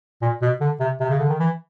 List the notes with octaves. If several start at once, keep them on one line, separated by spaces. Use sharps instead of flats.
A#2
B2
D3
C3
C3
C#3
D3
D#3
E3